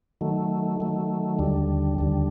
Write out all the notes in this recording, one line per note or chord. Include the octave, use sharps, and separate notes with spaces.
D#3 F#3 A3
D#3 F#3 A3
D#2 D3 G3
D#2 D3 G3